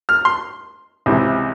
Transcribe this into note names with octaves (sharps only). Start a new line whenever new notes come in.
F6
C6
C#2 C3 E3